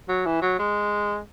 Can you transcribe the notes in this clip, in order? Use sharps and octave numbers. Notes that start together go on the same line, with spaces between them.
F#3
E3
F#3
G#3